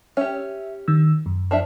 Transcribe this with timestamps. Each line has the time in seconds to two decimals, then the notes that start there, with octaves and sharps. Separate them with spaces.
0.17 C#4 G4 E5
0.88 D#3 E6
1.26 F#2
1.51 F3 D4 E5